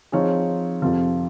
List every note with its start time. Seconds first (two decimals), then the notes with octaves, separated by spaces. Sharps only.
0.12 F3 C4 D#4 G#4 C#5
0.82 F2 C3 F3